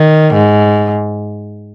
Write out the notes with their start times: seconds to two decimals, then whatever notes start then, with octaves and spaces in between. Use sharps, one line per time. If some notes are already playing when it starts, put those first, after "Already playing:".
Already playing: D#3
0.34 G#2